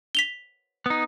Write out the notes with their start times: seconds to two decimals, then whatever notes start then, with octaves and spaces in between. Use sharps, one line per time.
0.15 B6 F7 G7
0.86 B3 D#4